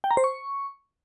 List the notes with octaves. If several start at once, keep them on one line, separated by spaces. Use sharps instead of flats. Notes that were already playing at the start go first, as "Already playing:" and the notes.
G5
A#5
C5
C#6